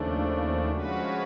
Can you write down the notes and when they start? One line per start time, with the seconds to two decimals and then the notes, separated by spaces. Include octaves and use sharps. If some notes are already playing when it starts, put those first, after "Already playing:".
Already playing: D#2 C#3 F3 A3 D4
0.70 F3 G#3 C#4 F#4 B4